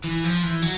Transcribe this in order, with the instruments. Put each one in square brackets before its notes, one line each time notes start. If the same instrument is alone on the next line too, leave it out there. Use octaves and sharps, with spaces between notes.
[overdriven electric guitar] E3
F3
E3
F#3